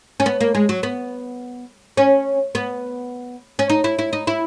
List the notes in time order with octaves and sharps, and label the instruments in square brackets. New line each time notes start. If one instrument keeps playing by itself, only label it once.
[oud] C#4
B3
A#3
G#3
F#3
B3
C#4
B3
C#4
D#4
E4
E4
D#4
E4